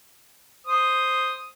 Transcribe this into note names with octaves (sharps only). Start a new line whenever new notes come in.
C5 D#6